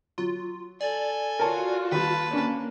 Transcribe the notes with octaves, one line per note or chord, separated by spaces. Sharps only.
F#3 F4
A4 D5 G#5
F4 F#4 A#4 C#5 A5
D#2 G3 B4 A5
A#3 C#4 D4 C#5